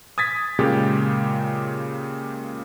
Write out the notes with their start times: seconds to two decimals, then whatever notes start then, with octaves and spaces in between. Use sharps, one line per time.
0.18 D#6 G#6 A6 B6
0.59 A#2 C#3 G#3 G4